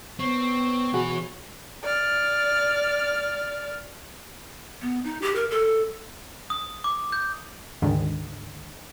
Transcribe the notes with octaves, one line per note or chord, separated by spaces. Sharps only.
B3 C4 C#5
B2 E3 F#4 G#4 B5
D5 F6
B3
D#4
G4
A#4
A4
D#6
D6
G6
D2 G#2 D3 D#3